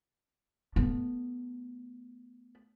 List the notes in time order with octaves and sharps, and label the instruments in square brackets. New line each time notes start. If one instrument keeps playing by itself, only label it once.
[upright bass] A3 B3